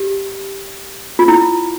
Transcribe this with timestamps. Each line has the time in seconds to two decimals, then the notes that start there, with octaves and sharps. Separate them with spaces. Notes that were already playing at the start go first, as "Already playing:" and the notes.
Already playing: G4
1.19 F4
1.28 E4